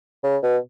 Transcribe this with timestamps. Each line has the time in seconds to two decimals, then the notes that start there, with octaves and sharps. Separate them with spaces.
0.23 C#3
0.43 B2